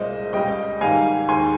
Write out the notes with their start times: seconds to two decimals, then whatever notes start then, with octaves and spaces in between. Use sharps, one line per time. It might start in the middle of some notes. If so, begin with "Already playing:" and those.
Already playing: C2 A#2 G#3 C5 D#5
0.33 C#2 C#3 G3 D#5 G5
0.81 G#2 D#3 G3 F5 G#5
1.29 D#2 D#3 G#3 G#5 C6